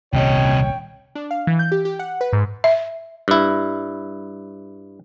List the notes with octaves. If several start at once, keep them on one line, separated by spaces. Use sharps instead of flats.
D#1 C2 C3 C#4 C#5 D#5 G5
D4
F5
E3
G6
G4
G4
F#5
B4
G#2
E5
G2 E4